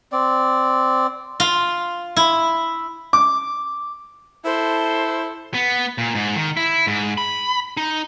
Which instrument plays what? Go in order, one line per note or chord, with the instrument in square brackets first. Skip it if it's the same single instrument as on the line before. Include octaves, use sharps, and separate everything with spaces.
[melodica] C4 D5
[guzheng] F4
E4
[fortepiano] D6
[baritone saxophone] E4 [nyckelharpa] A4 [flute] C5
[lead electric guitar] B3
A#2
G#2
D#3
E4
G#2
B5
D#4